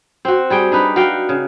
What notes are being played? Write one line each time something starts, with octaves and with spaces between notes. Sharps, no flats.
C4 F#4
G3 G#4 G5
D4 D#4 B4
F#4 F5 G5
C#3